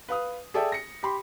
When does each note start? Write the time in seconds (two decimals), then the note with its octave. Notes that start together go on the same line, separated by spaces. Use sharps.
0.08 B4 F5 D#6
0.54 G#4 A4 D5 E5 G5
0.72 A#6 C#7
1.03 G4 B5 C6